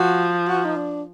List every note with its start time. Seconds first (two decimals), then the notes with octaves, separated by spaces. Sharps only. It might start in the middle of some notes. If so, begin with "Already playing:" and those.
Already playing: F3 F#4
0.48 F#4
0.65 D#4
0.76 D4